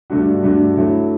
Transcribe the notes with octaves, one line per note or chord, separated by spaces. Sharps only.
G2 D3 A3 D4 F#4
G2 D3 A3 D4 F#4
D3 F#3 A3 E4